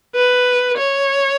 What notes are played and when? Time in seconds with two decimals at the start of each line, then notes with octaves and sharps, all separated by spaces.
0.15 B4
0.78 C#5